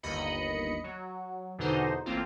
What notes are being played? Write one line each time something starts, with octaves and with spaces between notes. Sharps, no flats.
G1 D#2 D#5 B5 C#7
F#3
E2 B2 D3 D#4 C5
A1 A#3 C4 F4